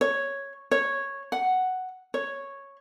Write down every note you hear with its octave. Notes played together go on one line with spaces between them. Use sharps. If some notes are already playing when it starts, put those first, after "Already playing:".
C#5
C#5
F#5
C#5